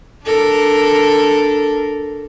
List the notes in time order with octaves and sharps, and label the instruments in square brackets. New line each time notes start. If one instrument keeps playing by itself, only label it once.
[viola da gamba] D4 A4 A#4